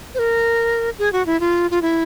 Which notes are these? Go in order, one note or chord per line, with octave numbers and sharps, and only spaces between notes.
C5
A#4
G#4
F#4
E4
F4
F4
E4